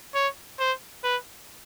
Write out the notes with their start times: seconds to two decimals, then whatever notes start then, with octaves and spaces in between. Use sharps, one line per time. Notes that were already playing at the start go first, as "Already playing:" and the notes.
0.15 C#5
0.59 C5
1.04 B4